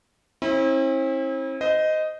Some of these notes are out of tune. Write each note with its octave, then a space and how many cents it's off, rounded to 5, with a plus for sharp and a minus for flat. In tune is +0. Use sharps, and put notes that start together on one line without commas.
C4 +45 E4 -30
C5 -30 D#5 +0